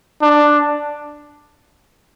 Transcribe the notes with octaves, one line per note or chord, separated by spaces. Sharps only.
D4